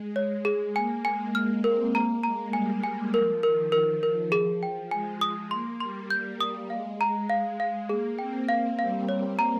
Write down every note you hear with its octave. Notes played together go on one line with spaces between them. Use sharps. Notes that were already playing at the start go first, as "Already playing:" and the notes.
Already playing: G#3
C#5
G#4
A#3 G#5
G#3 G#5
A#3 F6
C4 A#4
A#3 A#5
G#3 A#5
G3 G#5
G#5
F3 A#4
D#3 A#4
F3 A#4
A#4
G#4
G5
G#3 G#5
D#6
A#3 C6
G3 C6
G3 G6
D#6
G#3 F5
A#5
F5
F5
A#3 G#4
C4 G5
A#3 F5
G3 F5
C#5
A#5